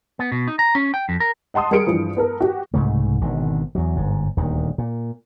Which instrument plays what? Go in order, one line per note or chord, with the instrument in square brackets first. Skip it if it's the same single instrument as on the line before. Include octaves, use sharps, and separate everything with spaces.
[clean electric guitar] B3
B2
D#4
A#5
C#4
G5
F2
A#4
[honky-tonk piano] D#5 F#5 A5 C6 D#6
G3 G#4 A#4 C#7 D7
G2 E3 F3
B3 A4 A#4
F#4 G4
[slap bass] C2 G#2 C#3 A3
G#1 B2 D3 D#3
E2 F#3
G1 G#2
D#1 D2 D#3
A#2